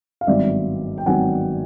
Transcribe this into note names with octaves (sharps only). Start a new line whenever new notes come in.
F5
G#1 G2 D#3 F#3 B3 D5 E5
G5
G#1 G2 D#3 F#3 B3 F#5 G#5